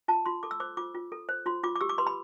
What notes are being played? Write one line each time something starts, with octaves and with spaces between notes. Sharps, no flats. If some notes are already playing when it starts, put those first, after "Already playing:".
F4 A5
F4 C6
A4 D6
E6
C5 D6
F4 D6
F4
A4
C5
F4 C6
F4 D6
D6
G4 E6
D6
B4 C6
B5